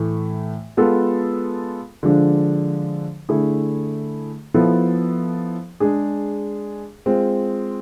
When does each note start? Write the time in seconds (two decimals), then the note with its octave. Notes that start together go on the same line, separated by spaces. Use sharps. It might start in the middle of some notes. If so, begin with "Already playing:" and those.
Already playing: A2 E3 A3
0.77 G#3 B3 F4 A4
2.03 D3 F3 G#3 D4
3.29 D3 A3 E4 G#4
4.54 F3 B3 E4 A4
5.80 G#3 D4 G#4
7.06 G#3 C4 F4